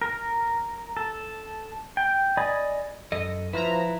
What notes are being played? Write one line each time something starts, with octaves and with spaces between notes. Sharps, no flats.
A#4
A4
G5
D5 D#5 G#5 B5 D#6
F#2 A4 D#5
F3 E4 B4 A#5